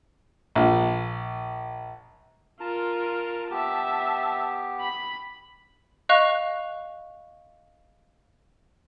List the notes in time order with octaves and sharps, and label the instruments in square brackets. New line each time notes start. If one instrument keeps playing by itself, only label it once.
[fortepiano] A#1
[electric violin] F4 A#4 [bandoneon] A5 A#5
[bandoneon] B3 G4 [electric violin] E5 A5
[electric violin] B5
[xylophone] D#5 F5 C#6 F#6 F7